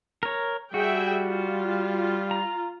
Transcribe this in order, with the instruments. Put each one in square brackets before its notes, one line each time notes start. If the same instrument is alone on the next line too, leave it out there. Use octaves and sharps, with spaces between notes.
[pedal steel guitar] A#4 C#5
[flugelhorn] G3 [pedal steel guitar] F#4 [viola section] G#4 E5 G5
[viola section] F4
[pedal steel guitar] A#5